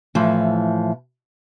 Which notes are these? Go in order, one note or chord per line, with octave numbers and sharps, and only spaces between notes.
A2 E3 F3